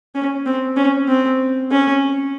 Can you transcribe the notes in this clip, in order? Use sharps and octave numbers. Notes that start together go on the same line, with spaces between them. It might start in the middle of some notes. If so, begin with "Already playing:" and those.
C#4
C4
C#4
C4
C#4